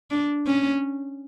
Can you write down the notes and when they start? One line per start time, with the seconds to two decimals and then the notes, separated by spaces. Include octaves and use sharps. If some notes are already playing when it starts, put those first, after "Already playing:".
0.11 D4
0.47 C#4